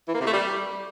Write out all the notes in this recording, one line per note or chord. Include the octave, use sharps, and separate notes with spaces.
E3
A#3
C3
A3
G3